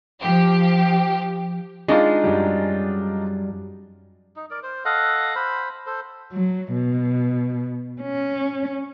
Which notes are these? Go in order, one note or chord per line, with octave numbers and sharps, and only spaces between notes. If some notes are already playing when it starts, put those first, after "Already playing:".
F3 G4
G#3 D4 D#4 F4
F#2 F#3 G3
D#4
A#4 D5
C5
A4 D#5 F5 F#5
C5 B5
A4 C5
F#3
B2
C#4